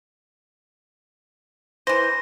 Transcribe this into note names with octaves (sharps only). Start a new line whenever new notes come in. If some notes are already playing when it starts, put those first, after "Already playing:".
E3 C5 A#6